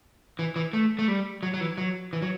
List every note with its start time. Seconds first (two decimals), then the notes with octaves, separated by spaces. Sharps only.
0.39 E3
0.56 E3
0.73 A3
0.99 A3
1.08 G3
1.43 F#3
1.54 F#3
1.61 E3
1.78 F#3
2.13 E3
2.22 F#3